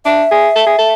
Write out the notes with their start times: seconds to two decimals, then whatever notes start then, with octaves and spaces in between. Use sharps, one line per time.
0.05 D4 E5
0.31 G#4
0.56 A4
0.67 G#4
0.79 A4